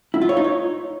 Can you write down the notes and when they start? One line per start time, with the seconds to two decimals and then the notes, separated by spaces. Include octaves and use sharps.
0.14 E4
0.22 F4
0.29 C#5
0.37 D#4
0.44 C#5